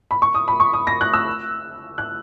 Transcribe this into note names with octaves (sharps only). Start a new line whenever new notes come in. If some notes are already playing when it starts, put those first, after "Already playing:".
B5
C#6
D#6
B5
C#6
D#6
A#6
F#6
E6
F#6